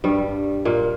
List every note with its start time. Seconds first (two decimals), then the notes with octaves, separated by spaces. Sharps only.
0.04 G2 G3
0.65 A#2 A#3